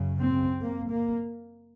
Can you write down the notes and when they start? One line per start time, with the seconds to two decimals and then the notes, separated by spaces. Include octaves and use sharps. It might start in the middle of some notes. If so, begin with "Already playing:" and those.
Already playing: F#2 C#3
0.19 C4
0.62 A#3
0.91 A#3